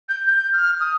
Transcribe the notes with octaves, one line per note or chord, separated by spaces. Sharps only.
G6
G6
F6
D#6